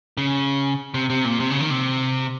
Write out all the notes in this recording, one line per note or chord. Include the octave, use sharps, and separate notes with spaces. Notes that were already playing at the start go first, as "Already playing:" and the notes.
C#3
C3
C3
A#2
C3
C#3
D#3
C3